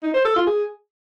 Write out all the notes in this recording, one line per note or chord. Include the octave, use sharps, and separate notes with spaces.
D#4
C5
A4
F4
G#4